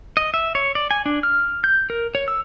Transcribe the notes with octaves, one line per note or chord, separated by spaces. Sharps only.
D#5
E5
C#5
D5
G#5
D4
F6
G6
A#4
C#5
E6